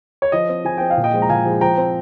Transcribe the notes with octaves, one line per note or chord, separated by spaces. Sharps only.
C#5
F3 D#5
C4
F3 G#5
C4 G5
F5
A#2
D#5 G5
F3 G#3
A#5
A#2 F5 G#5
F3 G#3
F3 G5 A#5
C4